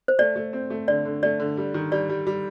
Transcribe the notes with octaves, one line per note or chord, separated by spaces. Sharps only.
C5
A3 D5
A3
C4
A3
D3 D5
D3
A3 D5
D3
G3
D#3
G3 D5
G3
G3